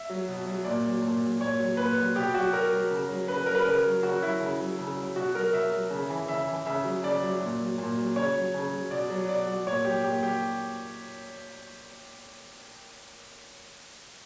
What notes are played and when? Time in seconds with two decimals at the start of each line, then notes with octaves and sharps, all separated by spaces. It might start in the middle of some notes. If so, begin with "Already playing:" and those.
Already playing: E5
0.09 F#3
0.28 B2
0.46 F#3
0.65 A#2 D5
0.85 F#3
1.02 A#2
1.21 F#3
1.40 A#2 C#5
1.59 F#3
1.77 A#2 B4
1.97 F#3
2.15 B2 G4
2.34 F#3 F#4
2.53 B2 A#4
2.72 F#3
2.90 C#3
3.09 F#3
3.28 C#3 B4
3.46 F#3 A#4
3.55 B4
3.62 C#3 A#4
3.85 F#3
4.03 C#3 F#4
4.22 F#3 E4
4.40 C#3
4.60 F#3
4.79 C#3
4.96 F#3
5.16 B2 F#4
5.34 F#3 A#4
5.53 B2 E5
5.72 F#3
5.91 C#3
6.10 E3
6.28 C#3 E5
6.47 E3
6.66 C#3 E5
6.84 F#3
7.03 C#3 D5
7.23 F#3
7.40 A#2
7.59 F#3
7.78 A#2
7.97 F#3
8.16 C#3 C#5
8.35 F#3
8.54 C#3
8.72 F#3
8.91 B2 D5
9.10 F#3
9.29 B2 D5
9.47 F#3
9.66 A#2 C#5
9.85 F#3 G4
10.04 A#2 G4
10.22 F#3 G4